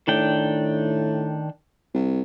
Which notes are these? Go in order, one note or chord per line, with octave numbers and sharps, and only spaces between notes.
A2 D#3 D4 G5
C2